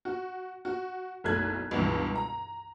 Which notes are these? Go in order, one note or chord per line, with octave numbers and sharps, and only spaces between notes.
F#4
F#4
F#1 B1 A3 F#6 G#6
C#2 G2 B2 E3
A#5